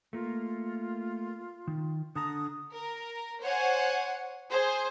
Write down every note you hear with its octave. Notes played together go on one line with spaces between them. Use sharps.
A3 A#3 F4
D#3
D3 A5 A#5 D#6
A#4
C5 C#5 F#5 G#5
G#4 C5